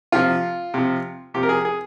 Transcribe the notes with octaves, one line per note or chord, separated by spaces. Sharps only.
C3 F3 F4
C3 F3
C3 F3 G4
A#4
G#4
G#4